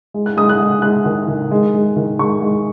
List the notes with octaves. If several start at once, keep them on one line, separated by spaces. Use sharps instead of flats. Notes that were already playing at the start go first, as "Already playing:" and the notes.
G#3
F#6
G#3 D#6
F#6
G#3
G#3 F#6
D#3
D#3
G#3
G#3
D#3
G#3 C#6
G#3